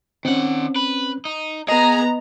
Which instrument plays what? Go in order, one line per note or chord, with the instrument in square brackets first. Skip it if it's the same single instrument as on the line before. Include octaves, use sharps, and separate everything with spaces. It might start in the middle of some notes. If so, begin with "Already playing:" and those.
[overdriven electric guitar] D#3 F#5 [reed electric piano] C4 C#4
[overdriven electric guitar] B4
D#4
[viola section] B3 A#5 [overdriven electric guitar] G#4 [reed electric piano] D#5